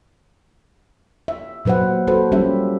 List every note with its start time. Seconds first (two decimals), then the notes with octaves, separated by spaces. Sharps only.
1.28 E5
1.65 A#2 F#3 B4 C5 F#5
2.07 F#4 A4 B4 C5
2.32 G3 C#4 F4 G4 E5